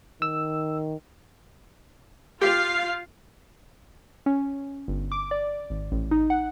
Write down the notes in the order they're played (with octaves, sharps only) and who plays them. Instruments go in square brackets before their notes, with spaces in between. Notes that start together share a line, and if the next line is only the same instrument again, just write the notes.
[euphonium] D#3 [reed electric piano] E6
[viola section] F4 F5 [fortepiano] G4 [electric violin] C7
[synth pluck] C#4
G1
D6
D5
G#1
A1
D#4
F#5